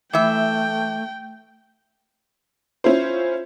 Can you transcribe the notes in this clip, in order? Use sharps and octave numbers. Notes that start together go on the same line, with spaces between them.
E3 A3 E5 G5
C#4 E4 F4 C5